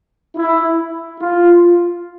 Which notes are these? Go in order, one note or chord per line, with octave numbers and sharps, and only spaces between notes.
E4
F4